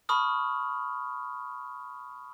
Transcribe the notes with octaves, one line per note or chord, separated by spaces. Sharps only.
A5 B5 C#6 D#6 F6